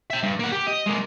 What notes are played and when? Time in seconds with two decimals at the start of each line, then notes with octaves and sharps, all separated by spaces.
0.10 E5 G5
0.23 G2
0.39 A#3 F#5
0.52 G4
0.67 D#5
0.86 G#3 A#3